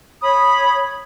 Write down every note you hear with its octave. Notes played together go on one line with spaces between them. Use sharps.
C#5 B5 D#6